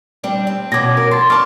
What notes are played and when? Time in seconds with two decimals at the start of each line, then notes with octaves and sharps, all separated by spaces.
0.23 G3 C4 D4
0.47 C4
0.72 B2 C#4 D6 G#6 A#6
0.97 A#4
1.11 A4 C6 A6
1.30 D5 A5 C#6 D6 F6